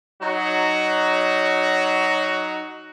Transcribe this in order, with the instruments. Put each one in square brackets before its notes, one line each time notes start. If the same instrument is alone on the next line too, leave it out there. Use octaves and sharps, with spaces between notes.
[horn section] F#3 D#4 F#4